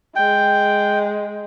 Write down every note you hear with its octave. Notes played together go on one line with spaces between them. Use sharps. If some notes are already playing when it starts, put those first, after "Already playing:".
G#3 G5